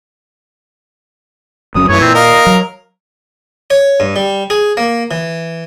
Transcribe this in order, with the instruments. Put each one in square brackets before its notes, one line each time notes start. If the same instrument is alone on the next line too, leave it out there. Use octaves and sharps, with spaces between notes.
[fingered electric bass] G1 F#3 C#4 [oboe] D#6
[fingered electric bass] F#2 A3 [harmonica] E3 [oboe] C#5
[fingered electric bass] A#2 [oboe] C4
[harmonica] A#4 F5 [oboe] D#5
[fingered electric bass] F#3
[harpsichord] C#5
G2
G3
G#4
A#3
E3